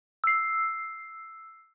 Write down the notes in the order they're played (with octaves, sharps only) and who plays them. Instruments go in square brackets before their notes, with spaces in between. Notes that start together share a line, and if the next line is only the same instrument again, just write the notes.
[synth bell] E6 C7